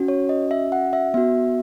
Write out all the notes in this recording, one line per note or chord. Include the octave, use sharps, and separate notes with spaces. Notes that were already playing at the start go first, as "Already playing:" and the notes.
Already playing: C#4 F#4
C#5
D#5
E5
F#5
E5
B3 F#4 E5